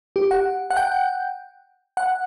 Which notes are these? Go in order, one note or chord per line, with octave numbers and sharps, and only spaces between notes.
G4
F#5
F#5
G5
F#5